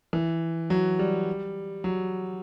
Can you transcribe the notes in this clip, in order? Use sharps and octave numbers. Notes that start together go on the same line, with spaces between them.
E3
F#3
G3
F#3